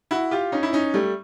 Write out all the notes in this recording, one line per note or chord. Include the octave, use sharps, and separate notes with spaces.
E4 F#4
F4 G4
C#4 D#4
E4
C#4 D#4
G3 A3